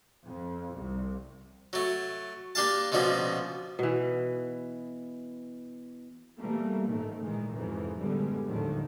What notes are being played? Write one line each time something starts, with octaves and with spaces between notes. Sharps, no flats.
F2
C2
F#3 A3
A#3 D4 G4 F5 A5
C#2 B2 D3 F3 A#3
B2 E3
B2 E3 G3 A3 A#3
A1 G#2 C3 D#3 A3
A#2 D#3 E3 G#3
F2 G#2 C3 D#3 E3
F#2 A2 D3 G3 G#3 B3
D#2 A2 D3 D#3 F3 F#3